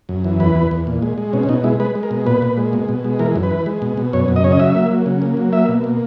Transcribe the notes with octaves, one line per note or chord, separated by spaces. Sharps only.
F#2
E3
E2 B4
E2
E2
A#2
G#3
G#3
B2 C#4
C#4
B2 D#4
G#3 E4
G#3 B4
G#3
A#4
B2
A#2 B4
A#2
G#3
B2
B2
G#3
E3 A#4
F#2
B4
E3
G#3
B2
B2
F#2 C#5
F#2
D#5
C#3 C#5
D#5
F#3 E5
A#3
F#3
C#3
A#3
F#3
A#3 E5
B2
A#3